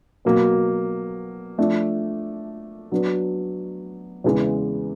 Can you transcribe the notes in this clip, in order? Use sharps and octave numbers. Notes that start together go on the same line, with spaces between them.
B2 F#3 A#3
F3 A3 D4
F#3 B3 D4
E2 C#3 E3 G#3